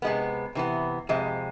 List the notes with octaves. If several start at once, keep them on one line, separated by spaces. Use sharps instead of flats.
C3 G#3 B3
C3 E3 B3
F2 C3 G#3